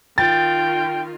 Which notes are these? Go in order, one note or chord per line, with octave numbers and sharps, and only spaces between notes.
D#3 F4 G5 A6